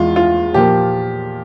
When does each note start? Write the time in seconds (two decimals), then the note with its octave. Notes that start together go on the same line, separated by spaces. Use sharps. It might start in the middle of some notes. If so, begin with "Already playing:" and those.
Already playing: E2 E3 G#3 F4
0.16 F4
0.54 A#2 F3 A#3 G4